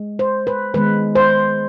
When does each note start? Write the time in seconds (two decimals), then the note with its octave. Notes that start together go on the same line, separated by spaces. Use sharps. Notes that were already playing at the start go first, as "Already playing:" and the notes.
Already playing: G#3
0.19 C5
0.47 B4
0.74 D#3 G#3 B3 B4
1.15 C5